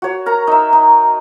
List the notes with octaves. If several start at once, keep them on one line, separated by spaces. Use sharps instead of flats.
F#4 C#5
A#4 A#5
D#4 E5
D#4